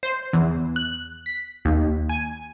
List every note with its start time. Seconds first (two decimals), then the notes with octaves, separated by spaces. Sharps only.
0.03 C5
0.33 E2
0.76 F#6
1.26 B6
1.65 D#2
2.09 G#5